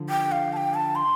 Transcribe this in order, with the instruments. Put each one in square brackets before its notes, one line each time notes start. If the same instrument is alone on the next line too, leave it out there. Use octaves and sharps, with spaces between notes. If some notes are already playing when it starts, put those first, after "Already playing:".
Already playing: [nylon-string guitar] D3 F3
[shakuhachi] G5
F5
A5
G5
A5
C6